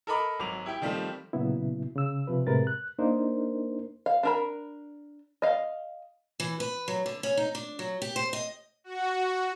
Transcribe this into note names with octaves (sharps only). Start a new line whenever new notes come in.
A4 A#4 D#5 A#5 B5 D6
G#1 F#3 D6 F7
E4 G4 G5
D#3 F3 G3 A3 C4
A#2 C#3 F#3 B3 E4
C#3 E6
C3 F3 B4
A2 C3 G#3 A#4 B4 A6
F#6
A#3 D4 D#4 A#4 C5
F5
D4 A#4 B5
D#5 F5
E3
B4
F#3
D3
C#4
D#4
D4
F#3
G4
C5
D#5
F#4